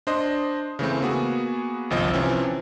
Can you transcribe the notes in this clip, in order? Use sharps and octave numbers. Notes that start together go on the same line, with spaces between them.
D4 C5 D#5
C#3 E3 A3 C4
A#3 B3 F#4 G#4
G1 C2 F3 D#5
C3 E3 F3 C4 C#4